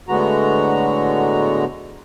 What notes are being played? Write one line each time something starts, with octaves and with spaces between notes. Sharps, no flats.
A2 D3 G#3 B3 F#4 A#5